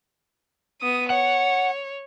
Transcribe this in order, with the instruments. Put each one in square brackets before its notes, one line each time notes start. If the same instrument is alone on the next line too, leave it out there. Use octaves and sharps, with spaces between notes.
[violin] B3 D#6
[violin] C#5 [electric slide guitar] F#5